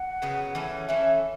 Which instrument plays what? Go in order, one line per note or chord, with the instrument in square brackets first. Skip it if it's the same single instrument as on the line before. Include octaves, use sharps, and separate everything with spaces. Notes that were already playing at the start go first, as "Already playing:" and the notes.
Already playing: [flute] F#5
[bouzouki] C#3 F#3 B3
E3 A3 C#4 A4
[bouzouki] E3 A3 C#4 A4 [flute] E5